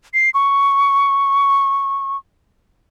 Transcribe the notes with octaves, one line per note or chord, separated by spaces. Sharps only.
C7
C#6